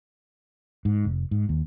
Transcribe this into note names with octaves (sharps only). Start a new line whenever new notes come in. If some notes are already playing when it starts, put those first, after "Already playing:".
G#2
F1
G#2
D#2